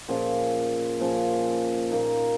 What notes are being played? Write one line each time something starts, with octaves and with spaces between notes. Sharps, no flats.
A#2 F3 C#4 G#4
A#2 F3 C#4 G#4
A#2 A#3 D#4